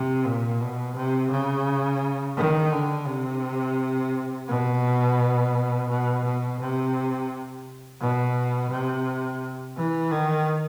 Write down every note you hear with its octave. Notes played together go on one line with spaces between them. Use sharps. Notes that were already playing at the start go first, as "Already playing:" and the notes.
Already playing: C3
A#2
B2
C3
C#3
D#3
D3
C3
B2
B2
B2
C3
B2
C3
E3
D#3